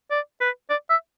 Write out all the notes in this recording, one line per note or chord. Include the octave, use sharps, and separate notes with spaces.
D5
B4
D5
E5